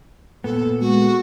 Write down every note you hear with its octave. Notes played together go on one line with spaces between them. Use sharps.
A#2 B3 A4
G#3 F#4